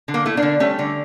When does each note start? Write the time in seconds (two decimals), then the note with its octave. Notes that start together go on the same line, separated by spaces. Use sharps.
0.08 D3
0.14 A#3
0.26 A3 E4
0.37 A#3 D4
0.42 D3
0.60 G3 A3 C#4
0.79 D3